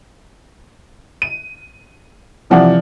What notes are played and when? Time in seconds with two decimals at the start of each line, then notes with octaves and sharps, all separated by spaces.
1.22 D#7
2.50 C3 E3 F3 D5 F#5